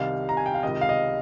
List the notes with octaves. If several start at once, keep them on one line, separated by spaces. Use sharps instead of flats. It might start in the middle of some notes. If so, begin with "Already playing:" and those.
Already playing: C2 C3 D#3 F5
A#5
G#5
G5
F5
C#2 C3 D#3 D#5
F5
D#5